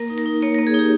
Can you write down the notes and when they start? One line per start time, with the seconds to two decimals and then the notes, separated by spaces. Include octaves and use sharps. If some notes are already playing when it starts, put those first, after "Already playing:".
Already playing: A#3 A#4
0.10 D#4
0.18 A#4
0.26 D#4
0.42 A#3 C#5
0.54 A#3 A#4
0.67 G#4
0.74 D#4 G4